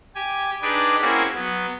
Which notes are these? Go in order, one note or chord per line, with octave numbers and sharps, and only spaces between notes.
G4 G#5
D4 D#4 G4 G#4 B4 D5
A#3 C4 C#4 E4 F#4 G#4
F#3 B3